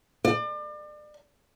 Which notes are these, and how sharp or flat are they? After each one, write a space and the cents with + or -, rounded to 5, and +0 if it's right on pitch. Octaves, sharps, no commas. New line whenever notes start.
D5 +35